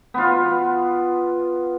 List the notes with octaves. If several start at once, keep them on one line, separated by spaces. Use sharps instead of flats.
B3 F4